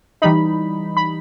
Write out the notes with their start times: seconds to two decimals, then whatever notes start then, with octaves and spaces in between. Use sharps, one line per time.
0.22 E3 G3 D#4 B5
0.97 B5